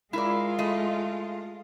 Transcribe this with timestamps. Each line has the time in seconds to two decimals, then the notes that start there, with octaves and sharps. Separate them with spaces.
0.13 G#3 E4 F4 A#4 D5
0.59 A3 D#5